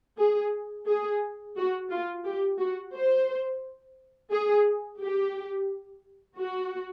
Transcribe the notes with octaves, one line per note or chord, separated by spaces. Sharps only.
G#4
G#4
F#4
F4
G4
F#4
C5
G#4
G4
F#4